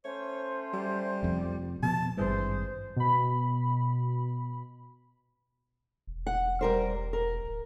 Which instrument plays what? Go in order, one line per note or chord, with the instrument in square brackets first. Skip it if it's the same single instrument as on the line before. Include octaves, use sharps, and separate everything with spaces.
[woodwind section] A3 C#4 C5 [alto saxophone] C#5
[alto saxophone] G3
[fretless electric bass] F1 F2
[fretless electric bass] B2 F3 B3 [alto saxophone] A5
[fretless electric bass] G#1 G2 G3 [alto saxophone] E3 [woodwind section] G#4 C5
[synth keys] B2 B5
[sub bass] E1
[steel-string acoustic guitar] F#5
G3 A#4 C5
A#4
[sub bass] D1